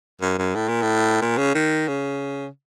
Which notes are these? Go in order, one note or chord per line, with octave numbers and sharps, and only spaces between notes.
F#2
F#2
A2
A#2
A2
A#2
C#3
D#3
C#3